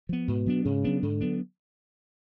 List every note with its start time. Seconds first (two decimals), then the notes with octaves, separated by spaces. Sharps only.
0.09 F3 B3
0.28 G#2 B2
0.46 F#3 B3 D4
0.65 G#2 C#3
0.84 F#3 B3 D4
1.02 G#2 D3
1.21 F#3 B3 D4